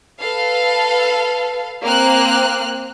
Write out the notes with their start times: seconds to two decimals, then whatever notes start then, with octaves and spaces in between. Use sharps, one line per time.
0.20 A4 B4 F5
1.83 A#3 C4 F6 F#6